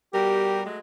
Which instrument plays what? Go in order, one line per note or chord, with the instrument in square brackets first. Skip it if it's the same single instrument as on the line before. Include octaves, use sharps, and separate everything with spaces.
[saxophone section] B2 A#4 [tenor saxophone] G3 [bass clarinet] G4
[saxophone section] F#3 G#3 A3